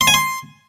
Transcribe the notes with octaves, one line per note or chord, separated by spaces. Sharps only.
C6
G#5
C6